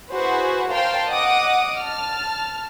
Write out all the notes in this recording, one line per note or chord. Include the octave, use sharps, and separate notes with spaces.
E4 F#4 G#4 B4 C5
A#4 C5 F5 G5 A5 C6
D#5 F#5 D6 D#6
A5 F6